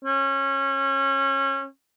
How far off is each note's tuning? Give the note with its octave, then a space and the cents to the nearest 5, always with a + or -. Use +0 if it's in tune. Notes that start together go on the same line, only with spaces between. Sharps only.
C#4 -25